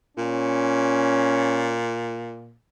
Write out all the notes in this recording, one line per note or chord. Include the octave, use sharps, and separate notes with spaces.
A#2 C#4